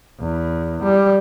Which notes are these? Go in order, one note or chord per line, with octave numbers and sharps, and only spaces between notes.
E2
G3